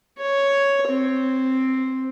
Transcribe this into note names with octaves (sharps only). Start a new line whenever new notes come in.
C#5
C4